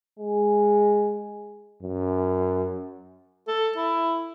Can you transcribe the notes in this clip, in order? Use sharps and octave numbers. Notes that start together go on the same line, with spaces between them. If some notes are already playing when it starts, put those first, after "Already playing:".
G#3
F#2
A4
E4